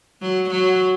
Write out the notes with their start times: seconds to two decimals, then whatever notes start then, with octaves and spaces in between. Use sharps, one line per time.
0.22 F#3
0.50 F#3